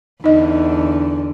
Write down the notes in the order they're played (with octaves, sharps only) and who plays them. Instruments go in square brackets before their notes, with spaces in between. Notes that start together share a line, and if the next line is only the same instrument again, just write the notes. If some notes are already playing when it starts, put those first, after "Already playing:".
[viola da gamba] E2 D3 [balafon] D#4 D#5